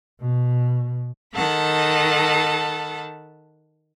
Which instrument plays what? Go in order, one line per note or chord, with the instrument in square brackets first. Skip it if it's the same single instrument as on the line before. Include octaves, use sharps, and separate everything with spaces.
[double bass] B2
[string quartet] D#3 A4 F#5 A5 B5